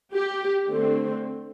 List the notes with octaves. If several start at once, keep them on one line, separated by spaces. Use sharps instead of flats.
G4
D3 A3 C4